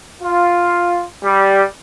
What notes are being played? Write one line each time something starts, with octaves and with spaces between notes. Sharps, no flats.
F4
G3